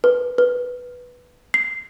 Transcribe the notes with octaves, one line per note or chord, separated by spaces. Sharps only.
B4
B4
C7